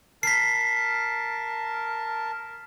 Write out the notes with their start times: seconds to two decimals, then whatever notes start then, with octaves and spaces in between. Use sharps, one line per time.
0.23 A#4 A5 B6 C7